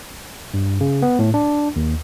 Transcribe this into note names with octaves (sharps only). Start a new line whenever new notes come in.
G2
C#3
B3
A2
D4
D#2